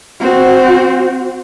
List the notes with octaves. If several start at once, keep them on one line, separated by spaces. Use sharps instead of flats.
C4 F#4